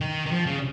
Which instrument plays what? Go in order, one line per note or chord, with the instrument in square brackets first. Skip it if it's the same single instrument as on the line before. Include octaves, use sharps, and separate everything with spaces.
[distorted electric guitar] D#3
D#3
F3
C#3